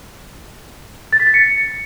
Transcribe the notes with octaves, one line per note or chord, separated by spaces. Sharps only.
A6
B6
A6
C#7